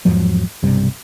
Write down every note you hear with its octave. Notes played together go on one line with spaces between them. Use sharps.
E2 G#2 F3 F#3
B1 G2 C3 G3